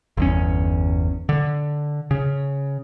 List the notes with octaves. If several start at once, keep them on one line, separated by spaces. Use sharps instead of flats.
G1 E2 C#4
D3
C#3